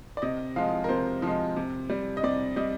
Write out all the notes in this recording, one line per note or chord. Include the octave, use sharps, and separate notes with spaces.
D5
C3 D#5
F3 G#3 F5
A#4
C3 C5
F3 G#3
C3
G3
D#5
C3 D5
G3 D#5